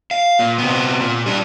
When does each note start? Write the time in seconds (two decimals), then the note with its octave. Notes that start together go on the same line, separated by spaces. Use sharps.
0.11 F5
0.39 A#2
0.58 C3 B3
1.01 A#2
1.26 G3 D4